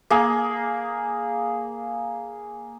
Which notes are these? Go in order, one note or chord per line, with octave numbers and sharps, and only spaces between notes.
A#3 G#4